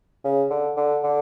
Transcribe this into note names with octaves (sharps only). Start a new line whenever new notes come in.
C#3
D3
D3
D3